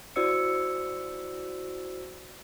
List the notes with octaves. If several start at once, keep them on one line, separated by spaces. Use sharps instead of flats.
E4 F#4 C5 D5 E6 C#7